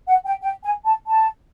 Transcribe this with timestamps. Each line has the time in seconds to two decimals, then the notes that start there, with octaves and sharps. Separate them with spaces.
0.08 F#5
0.26 G5
0.41 G5
0.63 G#5
0.85 A5
1.07 A5